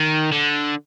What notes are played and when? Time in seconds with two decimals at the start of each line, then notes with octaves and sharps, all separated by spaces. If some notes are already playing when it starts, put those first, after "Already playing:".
Already playing: D#3
0.32 D3